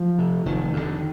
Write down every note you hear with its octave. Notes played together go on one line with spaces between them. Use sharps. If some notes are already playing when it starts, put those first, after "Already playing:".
Already playing: F3
C3
F1 D#3
F2 D3